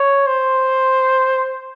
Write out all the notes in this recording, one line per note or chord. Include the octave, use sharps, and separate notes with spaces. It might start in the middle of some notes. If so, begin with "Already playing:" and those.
Already playing: C#5
C5